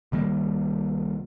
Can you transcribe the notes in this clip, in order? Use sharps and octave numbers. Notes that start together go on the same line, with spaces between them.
C2 D#3 G3 A#3